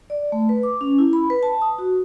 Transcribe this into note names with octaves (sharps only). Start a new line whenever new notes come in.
D5
A3
B4
D6
C#4
E4
B5
B4
A5
D#6
F#4